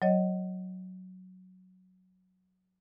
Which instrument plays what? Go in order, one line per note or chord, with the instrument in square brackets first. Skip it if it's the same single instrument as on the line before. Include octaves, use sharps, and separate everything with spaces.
[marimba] F#3 C#5 D#5